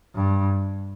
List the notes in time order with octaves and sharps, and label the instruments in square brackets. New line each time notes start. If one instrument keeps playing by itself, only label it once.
[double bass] G2